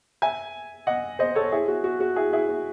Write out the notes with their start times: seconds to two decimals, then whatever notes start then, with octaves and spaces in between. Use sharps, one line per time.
0.22 E5 G#5
0.87 D#5 F#5
1.19 C5 D#5
1.35 A4 C#5
1.52 E4 G#4
1.68 F#4
1.84 F#4
2.00 F#4
2.16 E4 G#4
2.33 E4 G#4
2.49 F#4